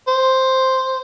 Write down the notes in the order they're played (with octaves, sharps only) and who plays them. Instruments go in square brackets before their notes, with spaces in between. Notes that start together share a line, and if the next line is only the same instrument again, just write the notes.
[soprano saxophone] C5